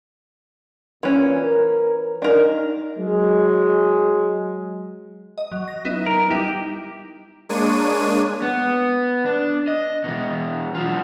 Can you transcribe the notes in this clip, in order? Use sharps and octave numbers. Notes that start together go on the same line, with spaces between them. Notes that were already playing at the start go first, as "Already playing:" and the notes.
A#2 E3 C#4
A#4
D4 D#4 A#4
F#3 G#3
D#5
F#3
A#6
B3 D#4 E4
A#4
G3 D#4 E4 G4
G#3 A#3 D4 C#5 D#7
B3
D4
D#5
B2 E3
F#3 F4